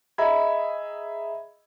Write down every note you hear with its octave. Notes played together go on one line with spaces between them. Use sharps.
G#4 D#5 E5 A#5 B5 G#6